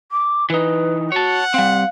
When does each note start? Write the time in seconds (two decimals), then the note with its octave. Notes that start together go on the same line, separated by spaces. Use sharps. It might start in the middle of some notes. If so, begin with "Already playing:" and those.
0.11 D6
0.50 E3 D#4 B4
1.12 F#4 C#5 F#5 A5
1.54 G3 C4 F5